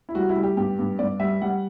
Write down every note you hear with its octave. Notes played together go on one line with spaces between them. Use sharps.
E4
G3 F#4
E4
G3
G4
G2 G4
G2
G2 D5
G3 E5
G3 F#5